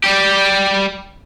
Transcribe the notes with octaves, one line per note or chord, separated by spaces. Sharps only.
G3 G4